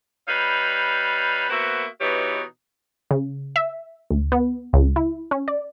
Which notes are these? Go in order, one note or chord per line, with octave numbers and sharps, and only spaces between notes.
G3 D#4 B4 C#5 F5
A#3 B3 F#4 C5 E5
B2 E3 D#4 G4 C#5
C#3
E5
D2
B3
C#2
E4
C#4
D5